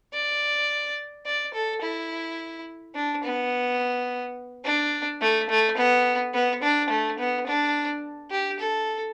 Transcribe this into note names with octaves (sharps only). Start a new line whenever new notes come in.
D5
D5
A4
E4
D4
B3
D4
A3
A3
B3
B3
D4
A3
B3
D4
G4
A4